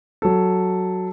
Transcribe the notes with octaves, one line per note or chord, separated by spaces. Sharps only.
F#3 A4